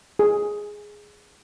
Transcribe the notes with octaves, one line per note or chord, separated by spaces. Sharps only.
G#4